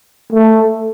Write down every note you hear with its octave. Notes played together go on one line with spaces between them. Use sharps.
A3